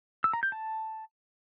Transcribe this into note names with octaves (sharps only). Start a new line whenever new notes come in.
E6
A#5
G6
A5